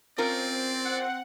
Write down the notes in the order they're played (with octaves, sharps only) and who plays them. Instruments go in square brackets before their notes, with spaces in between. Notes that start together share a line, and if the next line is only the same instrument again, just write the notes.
[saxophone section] C4 [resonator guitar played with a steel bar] C#4 F4 A#4 [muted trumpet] D5
[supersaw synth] F#5